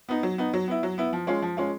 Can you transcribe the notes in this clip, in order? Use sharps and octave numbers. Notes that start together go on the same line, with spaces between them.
B3 D#4
F#3
B3 D#4
F#3
B3 E4
F#3
B3 E4
F3
G#3 C#4 F4
F3
G#3 C#4 F4